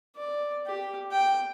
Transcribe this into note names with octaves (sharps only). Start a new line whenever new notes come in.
D5
G4
G5